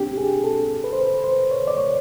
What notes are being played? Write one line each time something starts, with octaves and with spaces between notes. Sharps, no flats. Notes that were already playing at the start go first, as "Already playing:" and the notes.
Already playing: C4 D4 G4
G#4
A4
B4
C5
B4
C5
C#5
D5
C#5